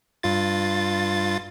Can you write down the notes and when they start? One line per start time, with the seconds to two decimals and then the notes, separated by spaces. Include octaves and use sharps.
0.23 G2 F4 A6